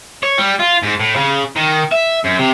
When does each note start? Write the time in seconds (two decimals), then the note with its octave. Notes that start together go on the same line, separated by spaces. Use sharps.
0.23 C#5
0.38 G3
0.59 F4
0.83 G#2
0.99 A2
1.16 C#3
1.56 D#3
1.92 E5
2.25 F#2
2.39 C3